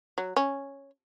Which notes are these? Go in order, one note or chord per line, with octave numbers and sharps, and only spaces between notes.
F#3
C#4